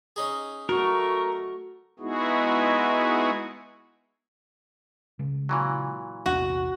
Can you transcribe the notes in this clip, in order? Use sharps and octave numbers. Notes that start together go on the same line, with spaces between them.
C#4 D#4 G#4
A3 F#4 A#4 C#6
G#3 B3 D#4 E4 F#4 G#4
C#3 G#3
A#2 E3 F#3
A#1 E2 C3 F#4